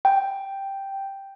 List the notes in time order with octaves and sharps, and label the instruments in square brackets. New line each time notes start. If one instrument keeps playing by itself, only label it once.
[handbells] G5